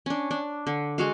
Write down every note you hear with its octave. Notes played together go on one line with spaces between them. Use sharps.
C#4 D4
D4
D3
G#3 F#4 F5